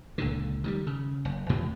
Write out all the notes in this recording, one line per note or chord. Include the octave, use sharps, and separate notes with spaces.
C#2 A#2 D3
D#3 F#3 G3
C#3
F#1
E2 A2 C3 F3